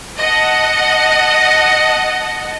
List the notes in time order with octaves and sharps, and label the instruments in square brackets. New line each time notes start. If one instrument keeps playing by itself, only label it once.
[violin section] D#5 F#5 A5